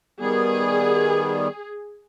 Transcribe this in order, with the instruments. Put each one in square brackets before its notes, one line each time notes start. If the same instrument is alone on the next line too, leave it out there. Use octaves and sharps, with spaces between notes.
[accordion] D#3 G3 B3 [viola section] G#4